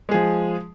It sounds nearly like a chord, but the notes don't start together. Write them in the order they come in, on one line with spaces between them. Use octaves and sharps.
G#3 G#4 F3